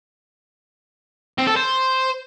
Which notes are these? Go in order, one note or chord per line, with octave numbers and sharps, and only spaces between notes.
C4
A4
C5